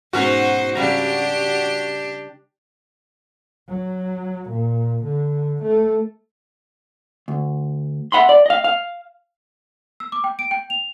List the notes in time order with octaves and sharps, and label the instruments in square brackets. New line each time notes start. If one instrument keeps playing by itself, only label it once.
[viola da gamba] G#2 D#4 C5 [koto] B2 C#4 A#5 [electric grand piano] F#4
[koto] C#3 G3 A#5 [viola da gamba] D4 G4
[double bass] F#3
A#2
D3
A3
[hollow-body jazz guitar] D2
E5 F#5 B5 C6
D5
D#5 F5
F5
[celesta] E6
D6
G5
D7
G5
F7